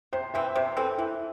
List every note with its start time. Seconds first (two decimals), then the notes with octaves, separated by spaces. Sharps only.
0.13 C3 C5
0.34 E3 C4 E5
0.55 C3 C5
0.77 E3 C4 A4
0.98 E3 E4